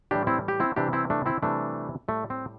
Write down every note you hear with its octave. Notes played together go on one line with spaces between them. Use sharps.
A2 E3 G3 D4 G4
C4 E4
G4
C4 E4
C3 E3 G3 D4 G4
C4 E4
A3 D4
C4 E4
C3 E3 G3 A3 D4
A2 G3 A3
C4